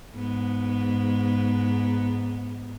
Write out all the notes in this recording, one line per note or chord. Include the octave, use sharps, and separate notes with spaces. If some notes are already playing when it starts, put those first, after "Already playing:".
G#2 B3